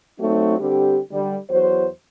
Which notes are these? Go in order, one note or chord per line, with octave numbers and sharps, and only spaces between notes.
F#3 A3 C4 D#4 F#4
D3 G3 C4 G4
D3 G3
E2 F#3 C5